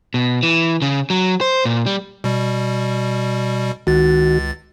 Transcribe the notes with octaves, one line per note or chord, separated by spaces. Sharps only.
B2
E3
C#3
F#3
C5
A#2
G3
B2 G3
C#2 D#3 F#4 A6